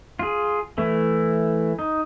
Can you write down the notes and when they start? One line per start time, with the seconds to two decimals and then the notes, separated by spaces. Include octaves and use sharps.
0.19 F4 G#4
0.78 E3 A3 E4
1.79 D#4